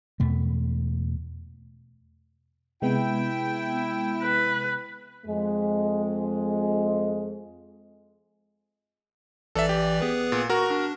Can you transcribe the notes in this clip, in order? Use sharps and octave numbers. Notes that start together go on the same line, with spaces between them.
E2 B2 A3
C3 G#3 B3 E4 G5
B4
F2 G#3
A1 E3 A4 D5 E5
G4
B3 G#4 B4
A#2
F#4 A#4 C#6
D4